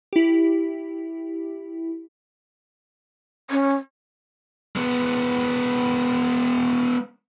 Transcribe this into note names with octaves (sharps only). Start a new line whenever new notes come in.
E4 G4
C#4
G#3 B3